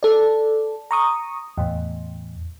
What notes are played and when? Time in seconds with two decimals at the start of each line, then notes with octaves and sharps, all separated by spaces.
0.03 A4 D5
0.91 A#5 C#6 D#6
1.58 E2 A2